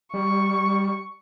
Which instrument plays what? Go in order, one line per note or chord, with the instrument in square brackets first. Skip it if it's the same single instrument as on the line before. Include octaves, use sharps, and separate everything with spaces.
[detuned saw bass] G3 [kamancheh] C#6